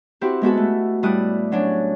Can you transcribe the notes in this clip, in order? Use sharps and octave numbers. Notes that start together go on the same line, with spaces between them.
C4 E4 F#4 G4
G#3 B3 F#4 A4
A3
A2 G3 E4 D5 D#6 F#6
F#3 C#4 D4